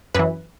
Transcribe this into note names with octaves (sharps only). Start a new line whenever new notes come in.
F#2 E3 B4